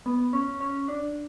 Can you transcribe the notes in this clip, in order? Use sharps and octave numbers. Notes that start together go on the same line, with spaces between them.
B3
C#4
C#4
D4